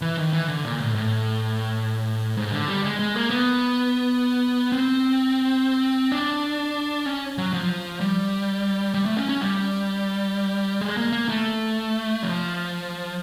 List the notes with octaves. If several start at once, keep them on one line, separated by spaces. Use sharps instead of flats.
E3
D#3
E3
D3
A#2
A2
A2
G#2
D3
G3
G#3
G#3
A#3
B3
C4
D4
C#4
F#3
F3
G3
G3
A3
C#4
C#4
G3
G#3
A#3
A#3
A3
F3